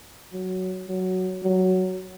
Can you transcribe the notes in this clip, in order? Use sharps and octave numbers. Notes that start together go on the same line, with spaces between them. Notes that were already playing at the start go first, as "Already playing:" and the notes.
F#3
F#3
F#3